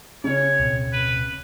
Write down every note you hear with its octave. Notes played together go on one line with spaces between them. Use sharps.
C#3 C#4 C#5
D1 B2 C4
B4